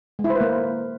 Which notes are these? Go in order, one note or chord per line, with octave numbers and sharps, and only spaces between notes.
G#3
E4
C5
B4
A#3